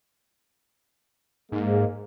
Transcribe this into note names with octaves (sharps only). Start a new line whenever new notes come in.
G#2 G#3 A#3